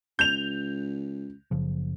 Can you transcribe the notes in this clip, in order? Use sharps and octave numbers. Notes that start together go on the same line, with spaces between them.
C#2 G6 F7
F#1 C#3 F3